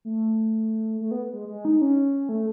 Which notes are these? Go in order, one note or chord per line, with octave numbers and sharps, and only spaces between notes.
A3
A3
B3
G#3
G#3
D#4
C#4
A3